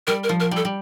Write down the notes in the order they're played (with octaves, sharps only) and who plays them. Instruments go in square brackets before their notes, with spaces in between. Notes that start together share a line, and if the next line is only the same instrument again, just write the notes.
[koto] G3 [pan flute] A#4
[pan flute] A#4
[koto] F3
[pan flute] A#4
[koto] G3 [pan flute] A4
[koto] G3